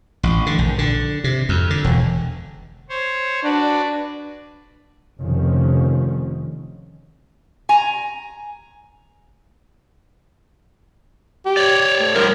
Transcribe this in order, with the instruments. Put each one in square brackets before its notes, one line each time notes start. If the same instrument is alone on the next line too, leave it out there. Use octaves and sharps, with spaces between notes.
[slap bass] A1
D3
A#1
D3
C3
F2
D3
E1
[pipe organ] C5 C#5
[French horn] D4 [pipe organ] F#4 B4 D5
[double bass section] F1 D3 D#3 F3 C#4
[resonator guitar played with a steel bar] G#5 A#5
[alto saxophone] G4
[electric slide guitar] C#5 D5
[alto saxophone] A3
[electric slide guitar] D3 F3 G3 [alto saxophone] A#4